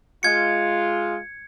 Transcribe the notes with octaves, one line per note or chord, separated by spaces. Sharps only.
G#3 F4 G#6 C#7